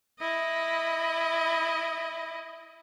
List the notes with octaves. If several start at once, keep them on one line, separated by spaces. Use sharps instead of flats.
E4 D#5